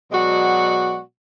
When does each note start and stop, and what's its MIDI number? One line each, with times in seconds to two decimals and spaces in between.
0.12 1.01 47
0.12 1.01 54
0.12 1.01 56
0.12 1.01 66
0.12 1.01 74
0.12 1.01 78